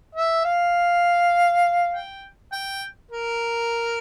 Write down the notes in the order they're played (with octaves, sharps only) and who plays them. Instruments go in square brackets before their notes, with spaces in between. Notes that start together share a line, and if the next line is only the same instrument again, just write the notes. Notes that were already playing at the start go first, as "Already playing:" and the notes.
[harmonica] E5
F5
G5
G5
A#4